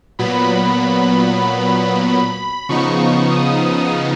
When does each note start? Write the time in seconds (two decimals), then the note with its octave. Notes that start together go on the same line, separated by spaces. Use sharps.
0.19 A#2 F#3 B3 B5
2.06 B5
2.69 C#3 F3 B3 D#4 C#6
3.32 D#6